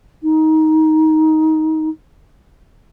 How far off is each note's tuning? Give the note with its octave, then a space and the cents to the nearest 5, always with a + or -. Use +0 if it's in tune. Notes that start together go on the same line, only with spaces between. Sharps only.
D#4 +15